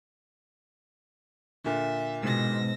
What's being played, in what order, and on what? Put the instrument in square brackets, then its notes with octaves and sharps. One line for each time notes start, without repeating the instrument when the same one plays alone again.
[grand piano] A#2 D3 [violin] E5
[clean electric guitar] G#2 [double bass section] B2 [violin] E6 A#6